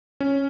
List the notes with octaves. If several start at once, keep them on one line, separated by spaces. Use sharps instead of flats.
C#4